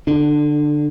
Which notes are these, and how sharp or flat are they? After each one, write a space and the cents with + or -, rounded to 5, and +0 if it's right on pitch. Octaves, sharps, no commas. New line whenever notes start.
D3 +0 D4 +25